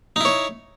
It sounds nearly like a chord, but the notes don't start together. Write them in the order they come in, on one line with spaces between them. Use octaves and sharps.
D#4 E4 C#5